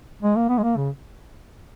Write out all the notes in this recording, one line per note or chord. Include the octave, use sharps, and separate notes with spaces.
G#3
A#3
B3
G#3
A#3
C#3